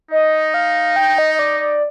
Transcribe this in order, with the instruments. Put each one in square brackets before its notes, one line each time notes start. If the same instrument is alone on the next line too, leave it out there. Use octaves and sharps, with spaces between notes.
[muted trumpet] D#4 [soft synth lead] D#5
[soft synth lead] F5
G5
D#5
D#5
D5
D5